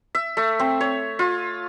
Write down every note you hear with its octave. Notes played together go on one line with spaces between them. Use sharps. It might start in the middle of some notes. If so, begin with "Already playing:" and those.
E5
A3
C4
C#5
F4